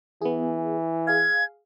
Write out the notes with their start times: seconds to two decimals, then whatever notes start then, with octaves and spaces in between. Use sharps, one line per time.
0.22 E3 B3 G#4
1.07 G#4 F5 G#6